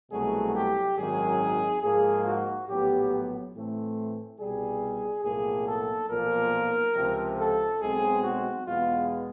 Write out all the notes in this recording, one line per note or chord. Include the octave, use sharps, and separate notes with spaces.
C2 B2 F#3 A3 G#4
G4
G#1 F#2 D#3 F#3 G#4
G#2 F3 A#3 G#4
F#4
A#1 A2 F#3 B3 G4
A2 E3 A3 C4
C2 B2 G3 G#4
B1 A2 F3 A#3 G#4
A4
B1 A#2 F3 A#3 A#4
C#2 C3 F3
A4
B1 B2 G#3 C4 G#4
F#4
E2 B2 G#3 B3 F4